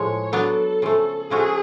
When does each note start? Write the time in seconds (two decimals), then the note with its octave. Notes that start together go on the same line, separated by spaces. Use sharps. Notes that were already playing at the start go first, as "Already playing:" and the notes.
Already playing: A2 F3 G#3 C#5
0.32 F#3 B3 D4 A4
0.82 C#3 F3 A3
1.30 C#3 F3 A3 C#4 F#4 G#4